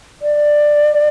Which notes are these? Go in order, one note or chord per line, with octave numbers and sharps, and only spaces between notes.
D5